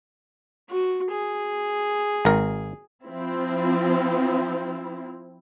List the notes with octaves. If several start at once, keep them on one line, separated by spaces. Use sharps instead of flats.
F#4
G#4
G#1 A#4
F3 C4 E4